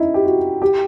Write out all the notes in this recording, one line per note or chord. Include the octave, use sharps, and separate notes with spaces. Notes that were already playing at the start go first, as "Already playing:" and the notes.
Already playing: C#4 D#4 E4
G4
F#4
G4